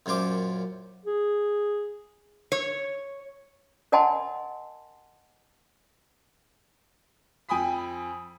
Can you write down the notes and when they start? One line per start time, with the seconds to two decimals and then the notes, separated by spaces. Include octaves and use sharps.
0.06 F#2 A#2 C#4 C5 D6
1.06 G#4
2.52 C#5
3.92 A#4 D#5 F#5 G#5 A5 C6
7.49 F2 G5 G#5 B5 D#6 B6